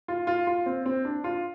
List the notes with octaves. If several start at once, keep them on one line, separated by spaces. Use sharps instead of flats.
F4
F4
F4
C4
C4
D4
F4